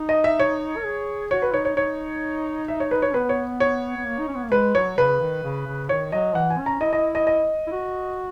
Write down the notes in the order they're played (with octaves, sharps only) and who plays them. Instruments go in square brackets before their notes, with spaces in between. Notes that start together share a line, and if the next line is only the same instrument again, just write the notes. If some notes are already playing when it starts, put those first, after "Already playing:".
Already playing: [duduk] D#4
[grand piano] D#5
E5
C#5
[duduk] A#4
G#4
[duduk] F#4 [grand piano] C#5
[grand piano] B4
[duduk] D#4 [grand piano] C#5
[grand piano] C#5
[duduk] D#4 [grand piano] C#5
[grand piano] E5
C#5
B4
C#5
[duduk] B3 [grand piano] B4
[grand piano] C#5
C#5
[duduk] B3
A#3
D#4
C#4
B3
A#3
[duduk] G#3 [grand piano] B4
[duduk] F#3 [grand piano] C#5
[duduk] C#3 [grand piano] B4
[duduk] D#3
C#3
C#3
[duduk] D#3 [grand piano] C#5
[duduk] F#3 [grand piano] D#5
[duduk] E3 [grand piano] F#5
[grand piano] G#5
[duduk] C#4
[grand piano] A#5
[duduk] E4 [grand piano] D#5
[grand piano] D#5
D#5
D#5
[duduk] E4
F#4